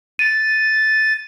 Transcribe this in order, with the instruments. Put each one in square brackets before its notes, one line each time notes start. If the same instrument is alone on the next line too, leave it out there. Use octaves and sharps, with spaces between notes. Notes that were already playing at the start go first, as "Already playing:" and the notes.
[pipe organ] A6 [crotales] D#7